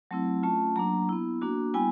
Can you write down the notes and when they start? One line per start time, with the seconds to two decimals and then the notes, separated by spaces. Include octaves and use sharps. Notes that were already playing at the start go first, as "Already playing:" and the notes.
0.11 F#3 A3 C4 E4
0.43 A3 C#4 F4 A5
0.76 F#3 A#3 D4 A#5
1.09 B3 E4
1.41 A#3 D4 F#4
1.74 G3 B3 E4 G#5